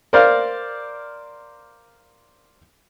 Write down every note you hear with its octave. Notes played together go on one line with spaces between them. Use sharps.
A#4 C5 D5 F5